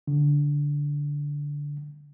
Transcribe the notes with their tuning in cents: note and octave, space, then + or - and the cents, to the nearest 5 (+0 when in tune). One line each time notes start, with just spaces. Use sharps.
D3 -15